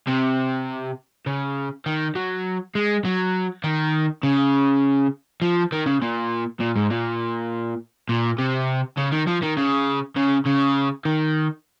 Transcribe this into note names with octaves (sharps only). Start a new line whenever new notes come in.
C3
C#3
D#3
F#3
G#3
F#3
D#3
C#3
F3
D#3
C#3
A#2
A#2
G#2
A#2
A#2
C3
C#3
D#3
F3
D#3
C#3
C#3
C#3
D#3